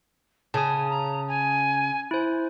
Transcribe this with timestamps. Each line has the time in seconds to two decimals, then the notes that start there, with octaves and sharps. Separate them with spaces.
0.54 C#3 G#5 A5 D#6
0.89 A#5
1.28 G#5
2.11 E4 C5